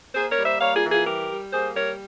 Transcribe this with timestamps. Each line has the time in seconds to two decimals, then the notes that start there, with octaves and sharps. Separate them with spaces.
0.15 A#3 G#4 C5
0.30 A#4 C#5
0.38 G3
0.45 C5 E5
0.61 A#3 C#5 F5
0.76 F4 G#4
0.84 E3
0.91 F4 G#4
1.06 G3 G4 A#4
1.30 G3
1.52 A#3 G#4 C5
1.75 G3 A#4 C#5